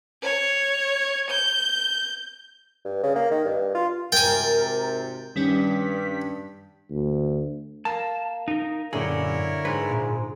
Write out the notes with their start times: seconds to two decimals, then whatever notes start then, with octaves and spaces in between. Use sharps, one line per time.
0.23 C#5
1.30 G6
2.85 G2
3.03 C#3
3.16 A#3
3.30 D#3
3.45 G2
3.75 F4
4.12 G#1 C3 A#4 G5 G#5 A6
5.36 G2 D#3 G3 C#4 B6
6.90 D2
7.85 A#3 A5
8.48 D#4 A#4
8.93 F#2 A#2 D3 E4 G#4 A#4 C#5
9.65 G#2 B4
9.91 A#2